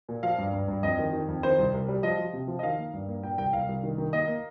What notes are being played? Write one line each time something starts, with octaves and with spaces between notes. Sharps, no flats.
A#2
F3 F5
G2
G2
G2
F2 D#5
D#3
D#3
F2
D#3 C5
C2
C2
G3
F3 D#5
F3
C3
F3
D#5
D#3 F5
A#3
G2
A#3
A#2 G5
C2 G5
C2 F5
C2
D#3
D#3
A#3 D#5
A#3